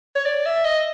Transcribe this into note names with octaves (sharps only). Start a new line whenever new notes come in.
C#5
D5
E5
D#5